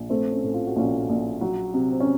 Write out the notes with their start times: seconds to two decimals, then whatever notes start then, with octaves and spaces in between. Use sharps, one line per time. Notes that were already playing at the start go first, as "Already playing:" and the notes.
Already playing: A#1
0.10 A3 C4
0.32 C#4
0.43 A2
0.54 F4
0.67 F#4
0.76 A#1 C#4 F4
1.09 A#1
1.41 F#3
1.74 C3
1.92 C4
2.00 C#4